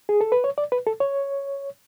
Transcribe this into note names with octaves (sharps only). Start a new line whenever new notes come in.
G#4
A4
B4
C#5
D5
B4
A4
C#5